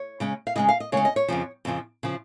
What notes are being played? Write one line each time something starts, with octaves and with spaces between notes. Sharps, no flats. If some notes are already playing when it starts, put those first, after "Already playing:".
Already playing: C#5
C#3 G#3 C#4
F5
C#3 G#3 C#4 D#5
F5
D#5
C#3 G#3 C#4 C#5
D#5
C#5
F2 C#3 F3
F2 C#3 F3
C#3 F3